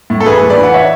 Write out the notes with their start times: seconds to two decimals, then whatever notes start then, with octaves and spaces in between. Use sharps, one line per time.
0.10 A2
0.20 A4
0.26 E3 G#4 B4
0.42 A2
0.49 B4 D5
0.58 E3
0.63 F#5
0.74 C#5 E5